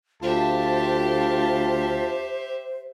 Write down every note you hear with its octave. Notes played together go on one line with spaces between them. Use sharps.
D2 F4 G4 C5 E5 A5